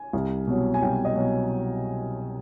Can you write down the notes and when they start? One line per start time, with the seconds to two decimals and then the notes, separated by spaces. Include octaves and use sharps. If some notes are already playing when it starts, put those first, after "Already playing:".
Already playing: G#5
0.13 C2
0.47 B2 F#3
0.74 G#5
0.82 C2 G5
1.05 D#5
1.16 B2 F#3